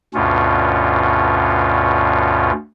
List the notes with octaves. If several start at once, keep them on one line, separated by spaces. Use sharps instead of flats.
D2 G2 B2 C#4 F4